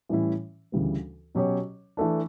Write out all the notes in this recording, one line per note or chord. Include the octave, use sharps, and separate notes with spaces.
A2 E3 G3 C#4 E4
D2 C#3 E3 G3 B3
B2 F#3 C#4 G4 C#5
E3 A3 D4